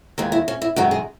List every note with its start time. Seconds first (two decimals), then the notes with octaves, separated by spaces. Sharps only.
0.18 D#2 D#3 G#3
0.32 E4
0.48 C#4
0.62 E4
0.76 F#2 D#3 G#3 F#4
0.91 G#4